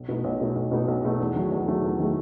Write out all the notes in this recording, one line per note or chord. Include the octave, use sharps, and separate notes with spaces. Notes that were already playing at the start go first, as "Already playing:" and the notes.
Already playing: B1
B2 A3 D#4
B1
B2 A3 D#4
B1
B2 A3 D#4
B1
B2 A3 D#4
E2
D#3 F#3 A3
E2
D#3 F#3 A3
E2
D#3 F#3 A3